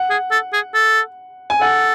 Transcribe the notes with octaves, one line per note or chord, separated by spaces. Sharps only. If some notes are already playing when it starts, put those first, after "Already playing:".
Already playing: F#5
G#4
A4
G#4
A4
G#5
A4 F#5